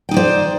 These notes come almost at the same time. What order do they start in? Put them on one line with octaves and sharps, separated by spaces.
G5 D#4 D5 C5